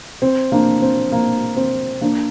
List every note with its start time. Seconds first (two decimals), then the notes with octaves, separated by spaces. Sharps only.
0.22 C4
0.52 A#3 D4
0.82 C4
1.12 A#3
1.57 C4
2.01 A#3 D4